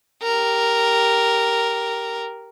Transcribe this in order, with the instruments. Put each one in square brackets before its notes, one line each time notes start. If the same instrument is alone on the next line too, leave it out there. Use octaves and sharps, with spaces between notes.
[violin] G4 A#4